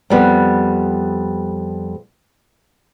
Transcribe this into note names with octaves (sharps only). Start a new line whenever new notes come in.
F2 G3 B3